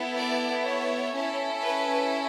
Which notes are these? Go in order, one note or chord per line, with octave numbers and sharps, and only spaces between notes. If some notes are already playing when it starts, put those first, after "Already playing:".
Already playing: B3 E4 A4
D5
C#5
C#4 E4 A4
B4